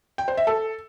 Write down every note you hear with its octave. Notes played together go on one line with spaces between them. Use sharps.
G5
C5
E5
A4